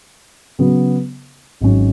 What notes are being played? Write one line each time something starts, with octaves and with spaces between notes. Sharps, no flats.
C#3 F#3 B3
G#1 G#2 F#3 C#4